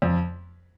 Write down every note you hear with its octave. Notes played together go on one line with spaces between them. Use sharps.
F2